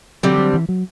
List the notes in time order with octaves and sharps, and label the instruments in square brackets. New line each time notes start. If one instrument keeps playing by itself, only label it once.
[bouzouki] D3 G3 C4 [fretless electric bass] F#3
[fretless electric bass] F#3
E3
F#3